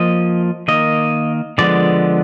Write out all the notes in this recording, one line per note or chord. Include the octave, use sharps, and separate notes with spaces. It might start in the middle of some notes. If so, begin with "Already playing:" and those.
Already playing: F3 A#3 D#5
D#3 A#3 D#5
D3 F3 G#3 B3 D5